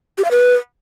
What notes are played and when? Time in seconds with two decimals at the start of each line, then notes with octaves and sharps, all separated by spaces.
0.18 G4
0.24 F5
0.31 B4